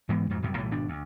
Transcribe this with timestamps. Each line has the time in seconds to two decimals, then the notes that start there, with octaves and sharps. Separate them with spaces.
0.09 G#2 E3 G#3 B3
0.30 F2 G#2 F#3
0.42 A1 F#2 C3 G3
0.58 B1 A2 E3 G3
0.71 G#1 B2 D4
0.88 D2